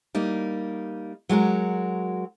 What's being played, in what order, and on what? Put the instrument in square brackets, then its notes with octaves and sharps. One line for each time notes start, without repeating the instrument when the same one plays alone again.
[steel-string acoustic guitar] G3 A#3 D#4
F#3 G#3 F#4 A#4